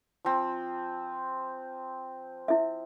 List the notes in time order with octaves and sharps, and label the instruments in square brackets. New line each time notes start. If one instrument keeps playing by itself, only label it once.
[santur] F3 C4
[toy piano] E4 E5